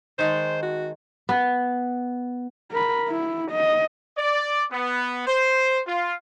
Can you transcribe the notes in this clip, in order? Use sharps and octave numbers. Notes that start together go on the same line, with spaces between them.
D#3 G#3 C5 A5
F#4
B3
A#4 B5
E4
D#5
D5
B3
C5
F4